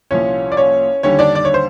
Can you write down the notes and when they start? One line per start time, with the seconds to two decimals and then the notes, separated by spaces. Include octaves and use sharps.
0.11 C2 A#2 F3 C#4 C#5
0.52 D5
0.57 C#4 C#5
1.03 D#2 D3 G3 C#4 C#5
1.19 D4 D5
1.35 D5
1.45 C#5
1.54 C5